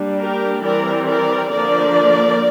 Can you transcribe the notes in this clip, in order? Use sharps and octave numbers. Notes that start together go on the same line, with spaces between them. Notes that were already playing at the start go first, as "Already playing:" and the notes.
Already playing: G3 A#3 D4
G4 A#4
E3 G3 C4 A#4 D5
A#4 D5
D3 F3 A#3 D4 A#4 D5